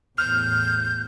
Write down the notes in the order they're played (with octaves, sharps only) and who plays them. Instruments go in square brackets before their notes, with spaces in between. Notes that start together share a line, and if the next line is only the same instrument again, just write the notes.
[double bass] E2 A2 [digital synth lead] F6 [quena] G6